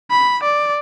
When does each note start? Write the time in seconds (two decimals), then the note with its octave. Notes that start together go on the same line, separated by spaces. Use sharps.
0.11 B5
0.43 D5